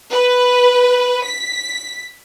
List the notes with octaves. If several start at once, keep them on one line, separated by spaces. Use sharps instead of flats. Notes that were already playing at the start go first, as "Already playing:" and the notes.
B4
B6